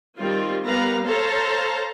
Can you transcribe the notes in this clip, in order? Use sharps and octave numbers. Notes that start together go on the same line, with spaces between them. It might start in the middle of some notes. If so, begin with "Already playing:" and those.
D#3 G3 C4 F4
G3 B3 A#4 B4 F5 A#5
A4 C5 C#5 F5 A5 A#5